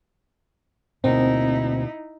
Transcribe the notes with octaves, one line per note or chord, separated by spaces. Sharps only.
D2 B2 A#3 C4 D#4 E4